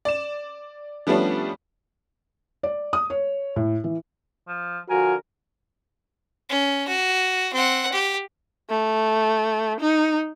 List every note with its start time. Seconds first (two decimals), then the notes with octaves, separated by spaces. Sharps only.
0.05 D5 E7
1.07 F3 G3 A3 B3 C#4 D4
2.63 D5
2.93 D#6
3.10 C#5
3.56 A2
3.84 E3
4.48 F3
4.90 D3 F3 F#4 A#4 G#5
6.49 C#4
6.88 F#4
7.53 C4 F#5
7.92 G4
8.70 A3
9.80 D#4